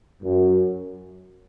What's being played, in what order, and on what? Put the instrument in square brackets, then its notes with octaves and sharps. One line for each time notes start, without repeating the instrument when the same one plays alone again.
[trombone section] F#2